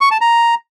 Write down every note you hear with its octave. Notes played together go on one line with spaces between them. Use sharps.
C#6
A5
A#5